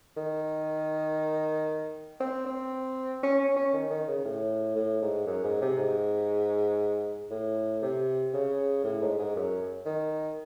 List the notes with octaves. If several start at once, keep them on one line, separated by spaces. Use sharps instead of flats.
D#3
C4
C4
C#4
C#4
C#4
D#3
D#3
C#3
A2
A2
G#2
F#2
G#2
C3
G#2
A2
C3
C#3
A2
G#2
G#2
F#2
D#3